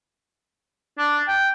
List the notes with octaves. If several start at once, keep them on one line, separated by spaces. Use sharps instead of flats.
D4
G5